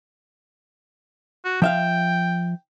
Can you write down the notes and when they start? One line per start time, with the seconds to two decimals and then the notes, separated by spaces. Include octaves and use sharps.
1.45 F#4
1.62 F3 E5 F5 G5